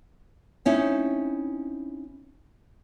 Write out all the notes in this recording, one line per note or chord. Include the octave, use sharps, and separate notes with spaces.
C4 C#4 D#4 E4